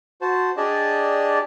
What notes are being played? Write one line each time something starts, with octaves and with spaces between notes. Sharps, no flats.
F#4 C5 A5
D4 G4 G#4 D5 D#5 A5